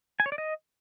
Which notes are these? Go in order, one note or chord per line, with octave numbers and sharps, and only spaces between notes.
G#5
C#5
D5
D#5